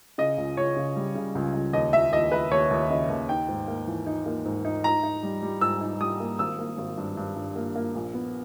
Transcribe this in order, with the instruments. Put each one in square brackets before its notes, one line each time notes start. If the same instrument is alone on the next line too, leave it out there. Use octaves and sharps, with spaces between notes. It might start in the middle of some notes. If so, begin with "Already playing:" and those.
[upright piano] C#3 D#5
C#2
C#2 C#5
C#3
G3
C#3
C#2
C#2
D#2 D#5
D#2 E5
D#2 D#5
D#2 B4
D#2 C#5
D#2
C#3 D#5
D#2
D#4 G5
G#2
A#3
E3
D#4
A#3
G#2
D#4
D#4 A#5
D#4
G3
G3
G#2 E6
D#4
G3 D#6
A#3
G#1 E6
A#3
G#1
G2
G2
G2
A#3
A#3
A#1
B3